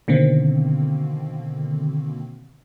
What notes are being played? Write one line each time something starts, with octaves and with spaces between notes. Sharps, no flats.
B2 D3 D#3 A#3 C4